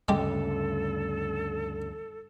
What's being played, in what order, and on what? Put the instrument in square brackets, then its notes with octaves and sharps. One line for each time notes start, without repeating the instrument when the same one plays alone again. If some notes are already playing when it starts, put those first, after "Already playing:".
[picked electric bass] D2 G2 C#3 [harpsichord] G#3 G4 [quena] A4